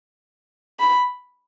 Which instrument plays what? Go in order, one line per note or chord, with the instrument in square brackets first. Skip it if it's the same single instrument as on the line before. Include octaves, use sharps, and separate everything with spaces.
[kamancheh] B5